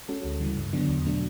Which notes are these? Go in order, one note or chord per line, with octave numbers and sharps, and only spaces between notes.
G#3 C#4 F#4 A4
D2
C#3 E3 G3
G2
D3 F#3 B3 D4
E2
B2 F#3 A3 D4